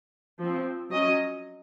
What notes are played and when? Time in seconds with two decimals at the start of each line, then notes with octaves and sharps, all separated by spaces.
0.39 F3 C4
0.90 F#3 C#4 D#5